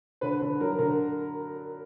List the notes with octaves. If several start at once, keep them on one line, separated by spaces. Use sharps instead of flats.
D3 B4
D3 B4
F#3 A#4
D3 A#4